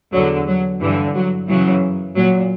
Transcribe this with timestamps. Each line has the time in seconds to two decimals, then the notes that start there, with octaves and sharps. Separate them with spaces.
0.13 E2 D3 F#3
0.47 F#3
0.81 G2 D3 E3
1.15 F#3
1.48 F#2 C#3 E3 F#3
2.15 A#2 F#3